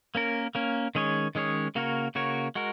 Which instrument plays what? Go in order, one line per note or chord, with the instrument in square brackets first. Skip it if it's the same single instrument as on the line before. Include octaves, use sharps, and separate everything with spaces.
[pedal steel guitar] A#3 C#4 A#4
A#3 C#4 A#4
D#3 G#3 C#4 G#4 C#5
D#3 G#3 C#4 G#4 C#5
C#3 A#3 F#4 A#4 C#5
C#3 A#3 F#4 A#4 C#5
G#3 F#4 A#4